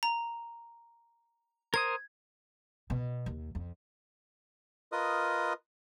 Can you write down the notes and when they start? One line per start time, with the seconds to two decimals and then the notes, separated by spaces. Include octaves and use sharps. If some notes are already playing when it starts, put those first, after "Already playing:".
0.03 A#5
1.74 A#4 C5 D#6 G#6
2.90 B2
3.26 D#2
3.55 F2
4.92 F4 A#4 B4 D#5 D#6